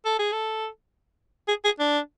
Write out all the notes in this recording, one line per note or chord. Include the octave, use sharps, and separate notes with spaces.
A4
G#4
A4
G#4
G#4
D4